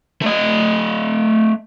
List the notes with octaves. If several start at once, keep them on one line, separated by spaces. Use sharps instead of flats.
A3 D#5